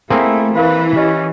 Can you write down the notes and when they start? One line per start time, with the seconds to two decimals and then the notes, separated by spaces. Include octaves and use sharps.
0.10 A3 A#3 C4 E4 G#4
0.55 E3 A#4 B4 F5 B5
0.96 C#4 G4 D#5